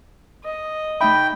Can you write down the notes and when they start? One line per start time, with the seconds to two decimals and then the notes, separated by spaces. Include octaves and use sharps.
0.44 D#5
1.01 A3 D#4 E5 G5 B5